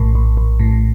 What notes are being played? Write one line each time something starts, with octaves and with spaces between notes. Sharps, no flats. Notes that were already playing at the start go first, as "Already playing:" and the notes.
Already playing: A#1 A2
A#1
A#1
A2